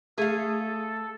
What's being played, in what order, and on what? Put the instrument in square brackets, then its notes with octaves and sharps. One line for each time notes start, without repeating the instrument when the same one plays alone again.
[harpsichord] A3 [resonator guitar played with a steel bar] G#4 F5 [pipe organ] A4